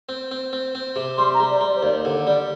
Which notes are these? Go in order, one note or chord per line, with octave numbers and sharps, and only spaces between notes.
C4
C4
C4
C4
C3
G3 C6
A#5
G3
D5
G3
D5
C5
D#2 D5
D3
G3 D5